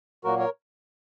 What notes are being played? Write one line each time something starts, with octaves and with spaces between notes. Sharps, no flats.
A#2 F#3 A#3 F#4 A#4
A#4 C#5